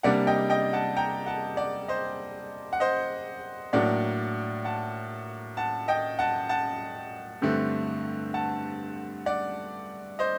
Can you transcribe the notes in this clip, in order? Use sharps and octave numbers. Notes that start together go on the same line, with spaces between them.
C3 G3 A#3 D4 D5 F#5
D#5 G5
D#5 G5
F#5 A5
G5 A#5
F#5 A5
D5 F#5
C5 D#5
F#5
C5 D#5
A2 F#3 A#3 D4 D5 F#5
F#5 A5
F#5 A5
D#5 G5
F#5 A5
F#5 A5
G2 D3 A3 C4
F#5 A5
D5 F#5
C5 D#5